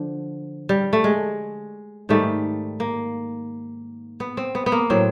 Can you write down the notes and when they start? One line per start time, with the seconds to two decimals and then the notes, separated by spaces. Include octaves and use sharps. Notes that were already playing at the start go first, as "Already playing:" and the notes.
Already playing: D3 F3
0.69 G3
0.93 A3
1.04 G#3
2.09 G#2 D#3 G3 A3
2.80 A#3
4.20 B3
4.37 C4
4.55 B3
4.66 B3
4.72 A#3
4.90 A2 F#3 C4